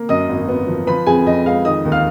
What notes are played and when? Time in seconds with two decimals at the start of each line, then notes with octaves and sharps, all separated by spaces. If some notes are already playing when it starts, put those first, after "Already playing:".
Already playing: A#3
0.09 F#2 D#5 D#6
0.29 G#1
0.48 B3
0.67 F3
0.87 F3 B4 B5
1.07 F2 G#4 G#5
1.26 F2 D#5
1.46 G#3 F5
1.65 D#3 D#5 D#6
1.85 D#2
1.92 F5 F6